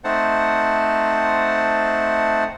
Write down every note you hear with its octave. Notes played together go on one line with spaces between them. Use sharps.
A3 C4 D#4 C5 F#5 A5